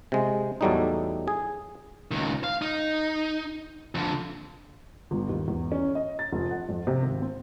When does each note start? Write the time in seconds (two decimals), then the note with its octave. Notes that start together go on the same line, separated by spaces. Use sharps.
0.12 C3 G#3
0.61 E2 A2 F#3 G3 A3 D#4
1.28 G#4
2.11 C#2 D#3
2.44 F5
2.62 D#4
3.95 F2 D3
5.11 G1
5.29 D#2
5.48 E2
5.72 C#4
5.95 D#5
6.19 A6
6.32 F1
6.51 F#5
6.69 F2
6.87 C3
7.02 G#1
7.22 C4